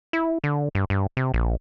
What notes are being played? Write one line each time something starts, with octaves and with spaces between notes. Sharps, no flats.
E4
D3
G2
G2
C3
A#1